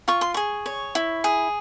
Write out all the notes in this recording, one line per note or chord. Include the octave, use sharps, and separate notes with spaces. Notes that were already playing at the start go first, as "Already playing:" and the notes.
F4 C#6
C6
G#4 C#6
C#5
E4
G#4